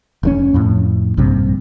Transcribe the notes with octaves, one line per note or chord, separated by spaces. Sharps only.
F1 C3 C#4
F2 A2
A#1 G2 C3